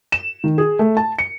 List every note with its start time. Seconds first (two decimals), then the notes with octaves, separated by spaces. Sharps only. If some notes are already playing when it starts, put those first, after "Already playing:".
0.12 E7
0.44 D#3
0.58 G#4
0.79 A3
0.97 A5
1.19 C#7